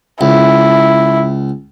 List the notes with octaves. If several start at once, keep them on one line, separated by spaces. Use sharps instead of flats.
C#2 E4